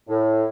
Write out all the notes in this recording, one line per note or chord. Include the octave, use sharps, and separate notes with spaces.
A2